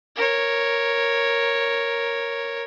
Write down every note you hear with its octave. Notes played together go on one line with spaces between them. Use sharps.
A#4 C#5